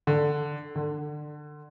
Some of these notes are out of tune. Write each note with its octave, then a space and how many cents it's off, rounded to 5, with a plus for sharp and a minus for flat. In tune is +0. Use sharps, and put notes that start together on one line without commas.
D3 +5
D3 +25